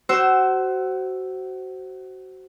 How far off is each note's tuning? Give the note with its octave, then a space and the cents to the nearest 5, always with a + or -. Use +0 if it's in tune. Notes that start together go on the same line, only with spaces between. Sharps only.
F#4 +25 C5 +0 E6 +0